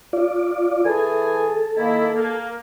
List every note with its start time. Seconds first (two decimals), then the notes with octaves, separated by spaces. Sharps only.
0.13 F4 D5
0.85 E3 G#4 A4 G#5
1.76 D#3 A#3 E4
2.14 A#3